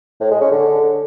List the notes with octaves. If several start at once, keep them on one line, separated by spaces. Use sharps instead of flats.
A2
G#3
C#4
D3